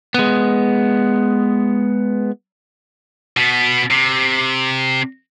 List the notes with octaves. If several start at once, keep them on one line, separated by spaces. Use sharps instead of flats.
G#3 B3
B2 B3
C3